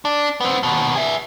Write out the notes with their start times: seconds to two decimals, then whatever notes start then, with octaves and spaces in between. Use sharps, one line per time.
0.05 D4
0.40 B3 C4
0.63 D#2 B2
0.96 G#4 E5